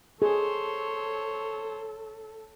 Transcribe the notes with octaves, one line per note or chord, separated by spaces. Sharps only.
G#4 A4 C5 C#5